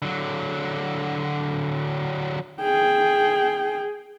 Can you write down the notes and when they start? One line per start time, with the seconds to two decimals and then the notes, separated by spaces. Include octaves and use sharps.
0.02 D3 F#3
2.61 G#4 G5